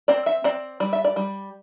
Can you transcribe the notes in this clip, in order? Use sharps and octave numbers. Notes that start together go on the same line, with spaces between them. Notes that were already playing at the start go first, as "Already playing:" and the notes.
C4 D5
E5
C4 D5
G3 D5
E5
D5
G3